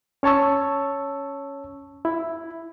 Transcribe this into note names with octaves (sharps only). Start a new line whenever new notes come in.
C#4 C#5 A5 C#6 E6
E4